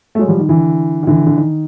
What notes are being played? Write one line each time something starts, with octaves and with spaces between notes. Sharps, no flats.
A3
F#3 G#3
F3 G3
D#3
D3 E3
D#3
D3 E3
D3
D#3